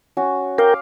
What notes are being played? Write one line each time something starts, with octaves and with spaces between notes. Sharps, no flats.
C#4 F#4 G#5
A#4 F5 G5 D6